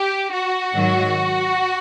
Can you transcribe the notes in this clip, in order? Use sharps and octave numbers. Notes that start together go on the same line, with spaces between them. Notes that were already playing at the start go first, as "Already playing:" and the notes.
Already playing: G4
F#4
G#2 D#3 F#3